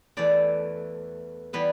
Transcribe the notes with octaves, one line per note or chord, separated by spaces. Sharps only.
E2 E3 A3 D5
E3 G3 B3 B4